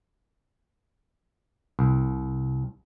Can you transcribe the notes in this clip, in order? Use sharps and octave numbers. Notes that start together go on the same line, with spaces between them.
C2